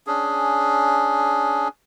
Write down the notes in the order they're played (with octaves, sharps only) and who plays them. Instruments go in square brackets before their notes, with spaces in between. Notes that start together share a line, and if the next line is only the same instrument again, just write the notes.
[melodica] C#4 D4 G#4